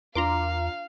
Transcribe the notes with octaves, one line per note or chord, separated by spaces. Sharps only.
E2 D4 F4 A#4 F5 A#5 C6 D6